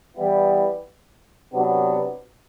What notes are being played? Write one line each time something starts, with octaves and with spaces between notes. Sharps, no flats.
E3 G3 B3 E4
C3 F#3 B3 D4